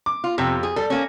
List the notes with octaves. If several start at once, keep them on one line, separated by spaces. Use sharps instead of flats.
D6
F4
F2 C3 G4 E6
G#4
G3 A4
A#3 C#4